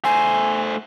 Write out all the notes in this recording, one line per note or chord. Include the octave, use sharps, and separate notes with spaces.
A3 C5 G#5